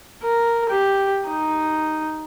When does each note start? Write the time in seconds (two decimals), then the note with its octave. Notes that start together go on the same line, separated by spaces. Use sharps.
0.24 A#4
0.70 G4
1.28 D#4